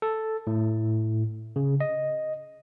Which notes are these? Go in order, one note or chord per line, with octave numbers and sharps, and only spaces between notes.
A4
A2
C#3
D#5